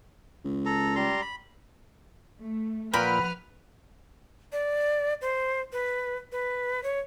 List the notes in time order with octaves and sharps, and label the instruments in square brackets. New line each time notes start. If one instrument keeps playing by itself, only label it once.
[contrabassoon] C#2
[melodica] A4 A#5
G3 A#5 C6
B5
[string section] A3
[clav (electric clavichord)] A#2 A#4 G5 [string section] F3 F#5 F6 [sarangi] B4 [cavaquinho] B5
[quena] D5
C5
B4
B4
C#5